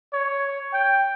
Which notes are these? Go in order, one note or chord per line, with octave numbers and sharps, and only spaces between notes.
C#5
G5